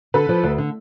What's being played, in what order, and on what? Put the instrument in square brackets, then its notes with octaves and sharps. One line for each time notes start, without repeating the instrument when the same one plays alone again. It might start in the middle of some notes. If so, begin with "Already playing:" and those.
[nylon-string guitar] D3 [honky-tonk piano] A4 B4
[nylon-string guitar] F3
D2
D3